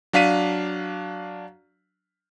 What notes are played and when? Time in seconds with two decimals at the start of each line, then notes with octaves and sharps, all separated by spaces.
0.13 F#3 D4 F5 B6 D#7